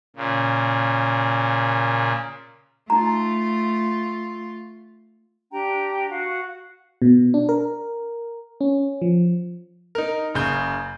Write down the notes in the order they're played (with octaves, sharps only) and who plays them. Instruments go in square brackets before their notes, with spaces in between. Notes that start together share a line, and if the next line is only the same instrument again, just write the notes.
[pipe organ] A#2 C#3
[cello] A3 F4 [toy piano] D#4 A#5
[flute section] D4 G4 G5 A#5
F#4 F5
[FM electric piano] B2
D4
A#4
C#4
F3
[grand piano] D#4 A#4
F#1 C#3 G6